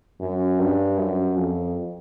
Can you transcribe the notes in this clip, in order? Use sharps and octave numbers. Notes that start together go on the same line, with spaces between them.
F#2
G2
F#2
F2